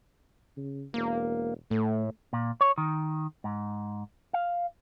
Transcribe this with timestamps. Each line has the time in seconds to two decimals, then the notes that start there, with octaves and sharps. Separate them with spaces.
0.57 C#3
0.94 E1 A#3
1.71 A2 A3
2.33 A#2
2.61 C#5
2.78 D#3
3.44 G#2
4.33 F5